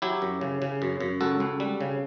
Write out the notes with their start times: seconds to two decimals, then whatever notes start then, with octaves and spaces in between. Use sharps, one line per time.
0.02 F#3 E4 G4
0.22 F#2
0.41 C#3
0.62 C#3
0.82 F#2
1.00 F#2
1.21 C#2 F#4 A4
1.40 C#2
1.60 G3
1.81 C#3